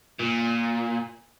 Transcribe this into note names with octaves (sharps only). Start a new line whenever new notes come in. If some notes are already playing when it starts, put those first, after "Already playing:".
A#2